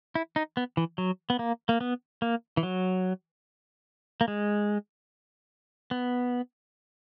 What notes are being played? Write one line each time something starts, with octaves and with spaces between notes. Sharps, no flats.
E4
D#4
B3
E3
F#3
B3
A#3
A#3
B3
A#3
E3
F#3
A#3
G#3
B3